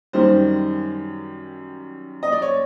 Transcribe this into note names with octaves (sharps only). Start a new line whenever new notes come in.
F#2 D#3 G3 C5
D#5
D5
C#5